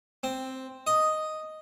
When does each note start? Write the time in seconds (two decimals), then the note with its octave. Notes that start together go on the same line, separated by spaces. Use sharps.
0.23 C4
0.87 D#5